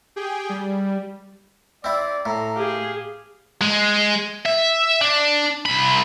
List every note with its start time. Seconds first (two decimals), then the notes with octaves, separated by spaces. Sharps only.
0.16 G4 G#4 G5
0.49 G3
1.84 C4 E4 D5
2.26 A2 A#5
2.56 G4 G#4 F5
3.61 G#3
4.45 E5
5.02 D4
5.66 C2 B5